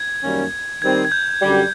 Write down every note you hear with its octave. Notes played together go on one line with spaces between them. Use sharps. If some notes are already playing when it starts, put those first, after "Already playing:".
Already playing: G#6
F#2 D#3 G3 A#3 C#4
D#3 G3 C4 G#6
G#6
G6
F#2 D3 G3